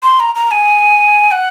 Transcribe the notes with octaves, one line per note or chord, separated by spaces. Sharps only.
C6
A#5
A#5
G#5
F#5